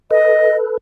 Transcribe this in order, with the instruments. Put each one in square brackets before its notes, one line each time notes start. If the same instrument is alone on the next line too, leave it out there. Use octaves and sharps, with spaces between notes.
[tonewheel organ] A4 B4 [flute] D#5